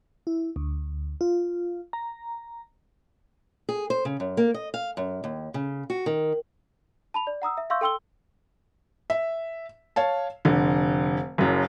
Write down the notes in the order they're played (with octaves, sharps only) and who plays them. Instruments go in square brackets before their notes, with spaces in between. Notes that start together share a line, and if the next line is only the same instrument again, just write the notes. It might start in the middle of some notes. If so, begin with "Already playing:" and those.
[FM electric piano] E4
D2
F4
A#5
[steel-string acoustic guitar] G#4
C5
C#3
F#2
A#3
D#5
F5
F#2
D#2
C#3
F#4
D#3
[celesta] A5 B5 F7
D5
F#5 A#5 D#6 E6
E5
E5 F5 C6 C#6 E6 G6
A4 G5 C6 E6 G7
[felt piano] E5
C#5 F5 A5
F1 D3
F#1 F#2